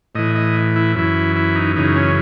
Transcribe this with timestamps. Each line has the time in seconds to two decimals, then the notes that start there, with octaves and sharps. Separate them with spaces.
0.15 A2 E3 D#5
0.35 D#5
0.76 E4
0.95 F#2 E3 E4
1.36 E4
1.55 D#4
1.76 F#2 C#3 E3 D#4
1.96 C#4